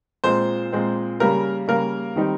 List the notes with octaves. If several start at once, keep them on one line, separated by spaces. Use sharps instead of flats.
A#2 G#3 C4 C5
A#2 G#3 C4
C#3 G3 A#3 A#4
C#3 G3 A#3 A#4
D#3 G3 C4 D#4